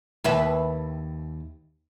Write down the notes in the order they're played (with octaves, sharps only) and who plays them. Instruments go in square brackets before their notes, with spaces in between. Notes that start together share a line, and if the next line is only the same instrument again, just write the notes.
[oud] D#2 B4 E5